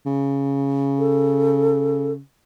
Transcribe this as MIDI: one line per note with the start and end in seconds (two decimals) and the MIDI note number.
0.06 2.20 49
0.99 2.12 69